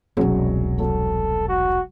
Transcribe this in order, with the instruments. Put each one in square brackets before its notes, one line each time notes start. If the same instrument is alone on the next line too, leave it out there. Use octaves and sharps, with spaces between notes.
[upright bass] E1 C2 [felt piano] F#3 C#4 G#4
[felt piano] F#3 [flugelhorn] A4
[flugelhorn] F#4